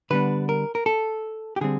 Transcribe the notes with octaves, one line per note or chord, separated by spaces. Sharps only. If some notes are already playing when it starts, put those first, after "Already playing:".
D3 G3 B3 D4 B4
A#4
A#4
A4
G4
D3 G3 C4 G#4